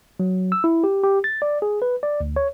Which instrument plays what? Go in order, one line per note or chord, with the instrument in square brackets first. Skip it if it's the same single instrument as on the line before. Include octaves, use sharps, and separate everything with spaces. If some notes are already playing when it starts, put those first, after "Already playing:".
[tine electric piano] F#3
E6
E4
G4
G4
A6
D5
G#4
B4
D5
D2
C#5